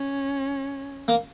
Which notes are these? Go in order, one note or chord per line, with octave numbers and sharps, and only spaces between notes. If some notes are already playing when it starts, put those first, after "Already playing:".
Already playing: C#4
A#3